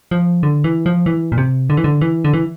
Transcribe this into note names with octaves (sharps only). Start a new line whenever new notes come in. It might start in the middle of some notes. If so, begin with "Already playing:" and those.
F3
D3
E3
F3
E3
A#2
C3
D3
E3
D3
E3
D3
E3